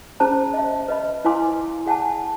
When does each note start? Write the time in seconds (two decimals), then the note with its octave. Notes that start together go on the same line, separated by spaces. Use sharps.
0.20 C#4 G#4 C5 A5 A#5
0.54 D#5 E5
0.88 B4 D#5 B5
1.25 E4 B4 F5 G#5 C6 D6
1.86 G#4 F#5 G#5 A5